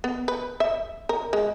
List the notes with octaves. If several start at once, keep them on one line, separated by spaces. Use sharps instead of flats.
B3
B4
E5
A#4
G#3